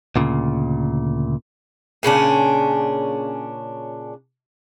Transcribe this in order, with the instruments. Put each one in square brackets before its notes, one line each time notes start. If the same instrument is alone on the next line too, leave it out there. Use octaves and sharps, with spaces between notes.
[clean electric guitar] D2 A#2 C#3
[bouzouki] A#2 C#3 C#4 D4